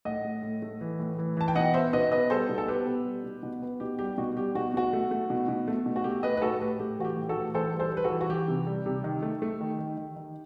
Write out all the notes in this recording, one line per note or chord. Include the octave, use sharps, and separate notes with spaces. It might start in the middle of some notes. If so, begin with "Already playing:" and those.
A2 D#5 F#5
A3
A2
A3
E3
A2
E3
E3 A5
G5
B2 D#5 F#5
B3 C5 E5
B2 B4 D#5
B3 B4 D#5
G3 A4 C5
B2
A4
B3 G4 B4
B3
G3
B2
B2
B3
B2 G4
G3 G4
B2 F#4
G3 G4
B2 F#4
B2 F#4
A3
A3
B2
B2
A3
B2
F#4
A3 G4
A3 B4 D#5
B4
A2 F#4 A4
A2 G4 B4
A3 G4
E3 F#4
G4
A2
F#4 A4
E3
E3 A4 C5
G3
A4 C5
G3
B4
F#4 A4
E3
F#4
E3 G4
C3
G3
C3
D#3
A3
A3
D#3
D#3
D#3
D#3